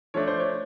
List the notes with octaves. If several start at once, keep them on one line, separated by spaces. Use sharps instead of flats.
F3 A3 D4 C#5
C5
C#5